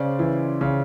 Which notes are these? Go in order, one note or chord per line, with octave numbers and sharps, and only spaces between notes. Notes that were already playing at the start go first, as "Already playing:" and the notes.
Already playing: C#3 C5 D5
E3
C#3